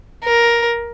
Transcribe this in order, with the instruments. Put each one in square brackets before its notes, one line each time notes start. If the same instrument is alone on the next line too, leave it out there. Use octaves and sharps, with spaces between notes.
[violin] A#4